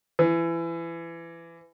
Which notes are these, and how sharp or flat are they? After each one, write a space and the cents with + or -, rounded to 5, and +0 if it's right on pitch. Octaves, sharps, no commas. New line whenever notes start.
E3 +25